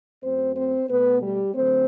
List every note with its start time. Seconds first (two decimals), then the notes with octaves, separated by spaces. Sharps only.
0.23 F#2 F#3 A3 C4 C5
0.56 C4 C5
0.89 B2 A3 B3 B4
1.22 G3 G4
1.55 D3 F#3 A3 C4 C5